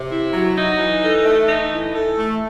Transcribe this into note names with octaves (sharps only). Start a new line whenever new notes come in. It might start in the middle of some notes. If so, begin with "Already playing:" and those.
Already playing: C3
E4
F#3
D#4
E3
A4
A3
D#4
E3
A4
A3